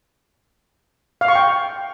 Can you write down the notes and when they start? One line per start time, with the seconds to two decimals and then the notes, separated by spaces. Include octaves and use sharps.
1.21 F5
1.28 C#6
1.35 G5